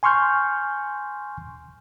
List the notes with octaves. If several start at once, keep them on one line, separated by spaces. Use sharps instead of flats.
G#5 C6 C#6 F6 G6